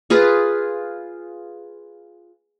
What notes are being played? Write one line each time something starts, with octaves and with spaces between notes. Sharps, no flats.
F4 G#4 B4